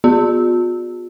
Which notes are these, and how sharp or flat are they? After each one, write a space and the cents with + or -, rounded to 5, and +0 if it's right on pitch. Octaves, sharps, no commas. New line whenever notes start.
B3 +0 F4 +45